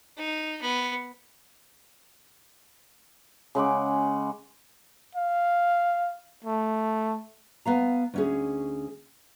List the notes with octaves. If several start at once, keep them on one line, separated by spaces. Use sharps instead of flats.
D#4
B3
C#3 G#3 F#5 D6
F5
A3
B3 F5 A#5
D2 C#4 G#4